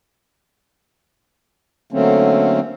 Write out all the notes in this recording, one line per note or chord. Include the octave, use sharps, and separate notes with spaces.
D3 F#3 A3 A#3 C4 C#4